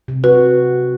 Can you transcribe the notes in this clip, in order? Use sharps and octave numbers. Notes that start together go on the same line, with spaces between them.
C3
F#4 B4